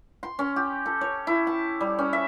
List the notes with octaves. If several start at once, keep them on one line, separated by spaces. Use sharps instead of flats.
C6
C#4
G4
A4
C#5
E4
A5
G3
C#4
E5